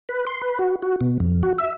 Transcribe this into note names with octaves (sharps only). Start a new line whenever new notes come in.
B4
C6
B4
F#4
F#4
B2
F2
F#4
E5